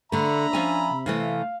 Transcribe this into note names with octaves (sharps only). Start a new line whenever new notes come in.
D3 A3 D4 E5 A#5 B5
F3 C#4 G#5
C3
C3 E3 A3 F5